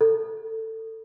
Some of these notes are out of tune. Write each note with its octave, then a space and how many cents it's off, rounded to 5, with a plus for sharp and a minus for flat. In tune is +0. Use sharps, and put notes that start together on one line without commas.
A4 +20